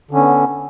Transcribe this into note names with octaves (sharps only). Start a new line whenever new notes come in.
D3 B3 C#4